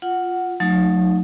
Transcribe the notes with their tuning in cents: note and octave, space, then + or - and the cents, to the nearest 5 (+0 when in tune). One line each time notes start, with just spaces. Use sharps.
F4 +0 F#5 +0
F#3 -30 A3 +0 D#4 +0